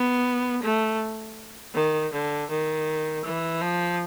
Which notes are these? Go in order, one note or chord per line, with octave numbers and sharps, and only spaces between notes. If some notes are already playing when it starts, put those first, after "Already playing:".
Already playing: B3
A3
D#3
D3
D#3
E3
F3